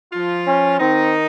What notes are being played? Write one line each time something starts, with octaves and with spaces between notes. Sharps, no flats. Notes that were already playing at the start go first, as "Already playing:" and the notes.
F3 F4
C#4
D#3 C4 D#4